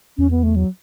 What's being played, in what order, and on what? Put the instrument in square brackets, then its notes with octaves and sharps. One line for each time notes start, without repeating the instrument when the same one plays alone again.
[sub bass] E2 [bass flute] C#4
[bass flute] B3
A3
F#3